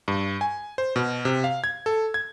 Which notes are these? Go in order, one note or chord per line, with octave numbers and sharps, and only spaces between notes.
G2
G#5
C5
B2
C3
F5
G#6
A4
G#6